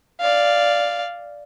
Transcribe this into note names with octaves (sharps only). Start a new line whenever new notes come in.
D5 F5